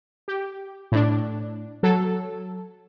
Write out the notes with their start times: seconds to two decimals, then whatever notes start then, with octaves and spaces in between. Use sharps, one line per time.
0.28 G4
0.92 A2 D4
1.83 F#3 A4